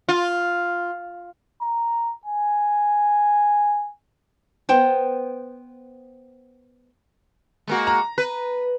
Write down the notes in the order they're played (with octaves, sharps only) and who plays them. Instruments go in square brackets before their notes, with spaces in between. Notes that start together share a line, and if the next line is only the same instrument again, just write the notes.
[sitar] F4
[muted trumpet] A#5
G#5
[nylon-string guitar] B3 C5 G5
[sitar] G#3 A#3 F#4
[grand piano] A#5
[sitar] B4